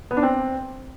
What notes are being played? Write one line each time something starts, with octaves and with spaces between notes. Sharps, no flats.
B3
D4
C4